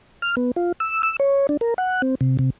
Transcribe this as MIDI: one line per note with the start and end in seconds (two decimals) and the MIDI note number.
0.22 0.35 89
0.37 0.51 59
0.56 0.72 65
0.80 1.02 88
1.03 1.16 88
1.20 1.47 73
1.49 1.57 62
1.61 1.74 70
1.78 2.02 78
2.02 2.15 60
2.21 2.37 48
2.39 2.50 48